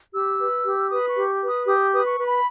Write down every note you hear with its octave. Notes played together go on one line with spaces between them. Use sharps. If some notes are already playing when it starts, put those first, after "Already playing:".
G4 E6
B4
G4
B4 D#6
C#6
G4
B4
D#6
G4 D#6
B4 D#6
C#6
B4
B5